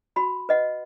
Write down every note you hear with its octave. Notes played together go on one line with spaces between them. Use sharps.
F#4 B5 C6
B4 D#5 F#5